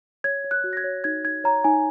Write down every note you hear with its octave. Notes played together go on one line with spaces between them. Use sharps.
C#5 G#6
C#5
F#6
F#4
A#6
G#6
C#5
D#4 G#6
D#4 G#6
C#5 A#5
D#4 G#5